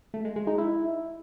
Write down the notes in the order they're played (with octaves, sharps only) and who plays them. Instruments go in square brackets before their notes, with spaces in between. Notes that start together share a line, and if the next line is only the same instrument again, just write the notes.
[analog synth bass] A3
G#3
G#3
D#4
E4